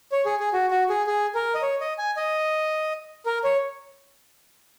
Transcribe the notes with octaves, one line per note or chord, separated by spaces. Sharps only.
C#5
G#4
G#4
F#4
F#4
G#4
G#4
A#4
D#5
C#5
D#5
G#5
D#5
A#4
C#5